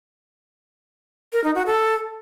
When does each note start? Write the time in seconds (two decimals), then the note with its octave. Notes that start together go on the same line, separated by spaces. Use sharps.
1.33 A#4
1.44 D#4
1.55 F#4
1.66 A4